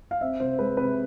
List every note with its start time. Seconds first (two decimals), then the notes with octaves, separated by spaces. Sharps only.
0.11 F5
0.21 C4 E5
0.40 C3 C5
0.59 G#3 B4
0.77 C3 B4